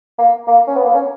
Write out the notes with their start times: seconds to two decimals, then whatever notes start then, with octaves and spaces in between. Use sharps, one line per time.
0.18 A#3
0.47 A#3
0.67 C#4
0.76 B3
0.85 A#3
0.94 C#4